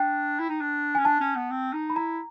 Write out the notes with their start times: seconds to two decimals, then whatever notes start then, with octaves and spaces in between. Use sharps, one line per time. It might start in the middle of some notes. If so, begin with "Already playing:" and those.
Already playing: D4 G5
0.39 E4
0.49 D#4
0.61 D4
0.95 C#4 G#5
1.05 D4 A5
1.21 C#4
1.36 B3
1.51 C4
1.73 D#4
1.90 B5
1.95 E4 A#5